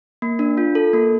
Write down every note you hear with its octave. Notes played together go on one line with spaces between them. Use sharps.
A#3
D4
F4
A4
A#3